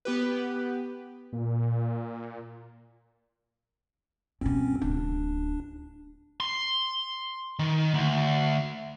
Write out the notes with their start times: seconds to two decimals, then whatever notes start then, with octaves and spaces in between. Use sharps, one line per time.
0.05 B3 G4 B4
1.33 A#2
4.41 G2 B2 C4 C#4
4.82 D1 D4
6.40 C6
7.59 D#3
7.94 D2